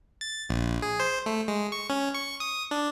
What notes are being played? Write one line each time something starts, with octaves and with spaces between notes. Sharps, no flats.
A6
A#1
G#4
C5
A3
G#3
C#6
C#4
C#6
D#6
D4